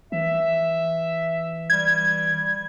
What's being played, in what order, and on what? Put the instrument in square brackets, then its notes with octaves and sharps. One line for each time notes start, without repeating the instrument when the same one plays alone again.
[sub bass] E3 [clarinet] E5
[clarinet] G3 [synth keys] G#6